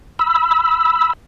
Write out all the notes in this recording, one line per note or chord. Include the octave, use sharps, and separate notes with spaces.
B5 E6